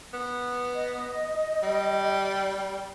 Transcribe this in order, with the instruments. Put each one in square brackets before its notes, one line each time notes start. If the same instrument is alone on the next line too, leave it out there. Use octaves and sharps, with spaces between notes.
[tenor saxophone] B3
[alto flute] D#5
[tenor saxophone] G3